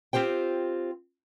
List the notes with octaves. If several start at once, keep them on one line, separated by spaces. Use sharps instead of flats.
C4 F4 G4 C5 G5